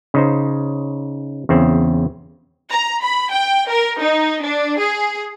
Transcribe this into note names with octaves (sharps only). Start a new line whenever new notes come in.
C#3 D#4 C5
E2 C#3 C4
A#5
B5
G5
A#4
D#4
D4
G#4